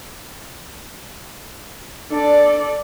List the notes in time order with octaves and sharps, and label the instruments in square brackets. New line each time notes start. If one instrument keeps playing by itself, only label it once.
[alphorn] D4 [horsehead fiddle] A4 D5